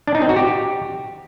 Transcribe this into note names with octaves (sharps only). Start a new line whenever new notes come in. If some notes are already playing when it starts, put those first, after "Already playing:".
D4
D#4
C4
F#4
G4